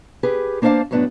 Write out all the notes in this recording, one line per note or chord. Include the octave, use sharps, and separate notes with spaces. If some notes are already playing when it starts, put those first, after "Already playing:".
G4 G#4 B4
A#3 D4 C5 C#5 F5 A5
F#2 A2 B3 D4